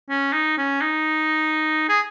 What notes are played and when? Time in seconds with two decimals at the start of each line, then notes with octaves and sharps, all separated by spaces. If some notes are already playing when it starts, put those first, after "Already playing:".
0.09 C#4
0.32 D#4
0.57 C#4
0.81 D#4
1.89 G#4